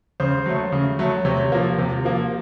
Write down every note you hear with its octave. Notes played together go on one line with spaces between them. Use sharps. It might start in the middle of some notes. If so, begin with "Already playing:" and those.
C#3 C5
F#3 A3
C#3
F#3 A3
C3 C#5
F3 A#3
C3
F3 A#3